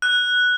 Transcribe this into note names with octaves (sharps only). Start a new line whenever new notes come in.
F#6